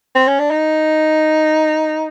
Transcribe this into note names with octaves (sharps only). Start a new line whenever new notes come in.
C4
C#4
D4
D#4